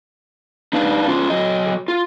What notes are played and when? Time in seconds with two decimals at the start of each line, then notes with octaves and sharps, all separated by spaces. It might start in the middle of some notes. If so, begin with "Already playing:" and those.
0.73 D4 D#4 B4 F5
1.07 C#4 F4 C5
1.30 F#3 D#5
1.88 F4